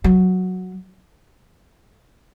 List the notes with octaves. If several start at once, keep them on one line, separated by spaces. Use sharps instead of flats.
F#3